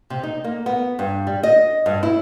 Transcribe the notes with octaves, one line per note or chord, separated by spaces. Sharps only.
C3
D#4
A#3
B3
G2
G3
D#5
G2
E4